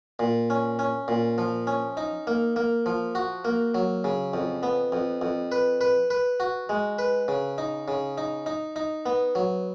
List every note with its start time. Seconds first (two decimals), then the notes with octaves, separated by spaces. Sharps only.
0.19 A#2
0.50 C#4
0.79 C#4
1.08 A#2
1.38 F3
1.67 C#4
1.97 D#4
2.27 A#3
2.56 A#3
2.86 F3
3.15 F#4
3.45 A#3
3.75 F#3
4.04 C#3
4.34 F2
4.63 B3
4.92 F2
5.21 F2
5.52 B4
5.81 B4
6.10 B4
6.40 F#4
6.69 G#3
6.99 B4
7.28 C#3
7.58 D#4
7.88 C#3
8.18 D#4
8.46 D#4
8.76 D#4
9.06 B3
9.35 F#3